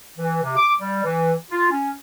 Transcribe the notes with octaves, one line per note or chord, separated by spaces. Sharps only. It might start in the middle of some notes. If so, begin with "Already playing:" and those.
E3
C3
D6
G3
E3
F4
C#4